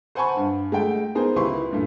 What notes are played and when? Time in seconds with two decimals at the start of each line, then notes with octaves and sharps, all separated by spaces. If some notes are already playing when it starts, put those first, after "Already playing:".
0.15 C5 F#5 G#5 A5 B5 C#6
0.36 G2
0.72 G#3 A3 G5
1.15 B3 D#4 G#4 A#4 C5
1.36 C#2 E4 G4 B4 C6 C#6
1.70 G2 A#2 A3